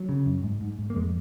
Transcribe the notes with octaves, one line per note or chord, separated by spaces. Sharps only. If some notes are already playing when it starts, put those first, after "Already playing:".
Already playing: F#3
C#3
F#2
G#2
G#2
G#2
A#3
F2 G#3